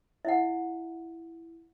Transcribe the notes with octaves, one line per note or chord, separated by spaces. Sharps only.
E4 E5 F#5